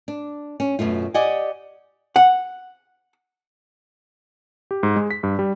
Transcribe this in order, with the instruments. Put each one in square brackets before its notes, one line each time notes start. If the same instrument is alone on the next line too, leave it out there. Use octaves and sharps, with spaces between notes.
[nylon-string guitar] D4
C#4
F#2 B2 A3 F4
G4 D5 D#5 F#5 G#5
[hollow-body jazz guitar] F#5
[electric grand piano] G4
G#2
G#3
B6
G2
G3